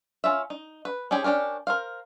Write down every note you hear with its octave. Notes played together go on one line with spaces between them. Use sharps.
C#4 F4 E5
D#4
B4
C#4 D#4 G4 G#4 C5
C#4 D4 G4 A#4
A#4 C5 F5